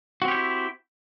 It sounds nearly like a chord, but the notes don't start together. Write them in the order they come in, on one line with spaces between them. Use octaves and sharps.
F#4 C4 G4 C#5 E4